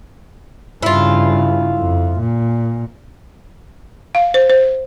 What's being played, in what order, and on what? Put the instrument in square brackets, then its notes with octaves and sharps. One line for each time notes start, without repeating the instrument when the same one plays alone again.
[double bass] G2 C#3 [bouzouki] E4 F4
[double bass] F2
A#2
[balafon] F5
C5
C5